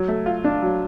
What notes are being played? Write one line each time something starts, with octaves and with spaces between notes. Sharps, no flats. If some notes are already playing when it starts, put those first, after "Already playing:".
Already playing: F#3
A3
F4
D4
F#3